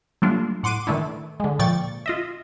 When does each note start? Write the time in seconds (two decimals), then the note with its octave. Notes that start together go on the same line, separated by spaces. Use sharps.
0.22 F#3 G3 A3 A#3 D4 F4
0.63 A2 F#5 C6 D6 D#7
0.87 D#3 E3 A3 D4 E4
1.40 D3 G#3
1.59 A#2 F3 D5 G5 C#6 A6
2.06 F4 D#5 E5